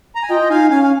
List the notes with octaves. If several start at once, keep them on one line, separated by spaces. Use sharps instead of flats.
A#5
G#5
F4 D#5 G5
F4
D#4 F5 G#5
C#4 F5 G#5
G#5